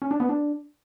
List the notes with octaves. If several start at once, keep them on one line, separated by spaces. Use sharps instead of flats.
C#4
D4
B3
D4